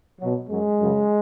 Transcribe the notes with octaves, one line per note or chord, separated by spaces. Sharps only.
B2 F#3
F#2 F#3 G#3
F#2 C#3 F#3